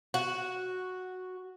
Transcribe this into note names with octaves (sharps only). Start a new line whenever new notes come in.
F#4